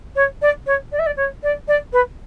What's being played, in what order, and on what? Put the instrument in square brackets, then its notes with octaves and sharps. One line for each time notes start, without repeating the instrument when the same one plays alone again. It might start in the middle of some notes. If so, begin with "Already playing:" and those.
[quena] C#5
D5
C#5
D5
E5
D5
C#5
D5
D5
B4